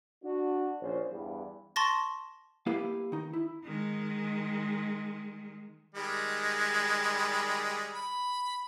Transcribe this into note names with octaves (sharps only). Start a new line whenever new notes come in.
D4 F#4
A#1 C#4 C5
E2 G2
A5 C6 C#6 A6 A#6
A#3 E4 G4 B4 F5
D#3 D#4
E4
D#3 G#3
D#3 G3 G#3
B5